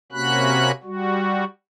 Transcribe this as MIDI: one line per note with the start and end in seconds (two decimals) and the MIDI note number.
0.12 0.72 48
0.12 0.72 58
0.12 0.72 61
0.12 0.72 66
0.12 0.72 83
0.12 0.72 90
0.83 1.44 55
0.83 1.44 66